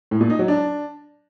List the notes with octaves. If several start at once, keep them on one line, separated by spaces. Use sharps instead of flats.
A2
A#2
D#4
F#3
D4